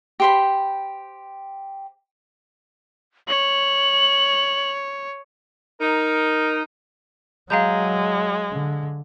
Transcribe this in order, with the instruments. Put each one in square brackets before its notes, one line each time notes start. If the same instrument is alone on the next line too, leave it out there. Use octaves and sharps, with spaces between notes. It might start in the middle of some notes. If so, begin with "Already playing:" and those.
[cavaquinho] G4 C5 B5
[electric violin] C#5 [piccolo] F#7
[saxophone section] D#4 A#4
[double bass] F#3 [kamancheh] G#3 [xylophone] F5 A#5 G6
[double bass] D3